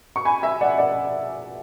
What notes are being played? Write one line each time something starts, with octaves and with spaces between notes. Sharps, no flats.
C#6
G#5 B5
E5 G#5
D5 F#5
D5 F#5